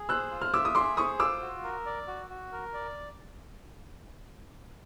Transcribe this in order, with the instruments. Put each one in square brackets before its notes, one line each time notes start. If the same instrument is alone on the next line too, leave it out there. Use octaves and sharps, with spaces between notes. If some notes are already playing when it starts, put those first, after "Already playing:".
Already playing: [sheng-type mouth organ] G#4
[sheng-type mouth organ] C5 [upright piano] E6 F#6
[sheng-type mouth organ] F4
[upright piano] F6
[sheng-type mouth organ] E5 [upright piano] D6 E6
[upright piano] D#6
[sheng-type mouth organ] G#4 [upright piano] C6 D6
[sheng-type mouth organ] C5 [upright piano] C#6 D#6
[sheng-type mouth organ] F4 [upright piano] D6 E6
[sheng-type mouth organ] F#4
A#4
D5
F#4
F#4
A#4
D5